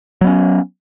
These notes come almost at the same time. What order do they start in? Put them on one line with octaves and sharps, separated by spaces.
F#3 B3 C#4